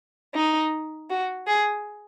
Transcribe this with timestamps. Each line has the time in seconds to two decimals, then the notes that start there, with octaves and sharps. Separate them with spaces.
0.36 D#4
1.11 F#4
1.47 G#4